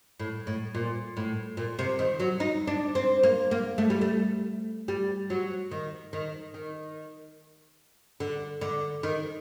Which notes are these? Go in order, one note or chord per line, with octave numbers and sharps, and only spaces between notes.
A2
A2
A#2
A2
A#2
C3
D#3
F#3
D#4
D4
C4
A#3
A#3
A3
G3
A3
G3
F#3
D#3
D#3
D#3
D3
D3
D#3